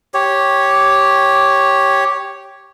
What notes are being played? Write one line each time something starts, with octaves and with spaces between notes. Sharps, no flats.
G4 C#5